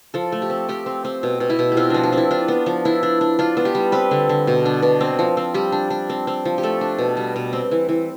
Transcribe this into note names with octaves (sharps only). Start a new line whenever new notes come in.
F3 A4
A3
G4
C4
F3 G4
C4
C4
B2
B2
E4
B2
G4
C4 F4
F3 D4
D4
C4 E4
D4 F4
B3
F3
D4 E4
D4
D4
D4 F4
B3
G4
G3
C4 B4
D3
D3
B2
D4
B2
C4
F3
C4
G3 G4
D4
D4
C4
C4
F3
G4
A3 A4
D4
B2
G3
B2
C4
E3
E3